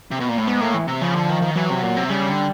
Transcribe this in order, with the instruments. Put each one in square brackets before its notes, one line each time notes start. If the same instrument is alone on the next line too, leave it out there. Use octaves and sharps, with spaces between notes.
[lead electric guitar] C3
B2
A#2
A2
[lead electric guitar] G#2 [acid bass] B3
[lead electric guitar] A2 [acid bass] A#3
[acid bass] E3
[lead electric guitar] C3
[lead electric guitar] C#3 [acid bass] F3
[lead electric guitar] D3
D#3
D#3
[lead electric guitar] E3 [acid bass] F#3
[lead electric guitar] C3
A#2
C3
[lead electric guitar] C#3 [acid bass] G3
[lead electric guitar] D3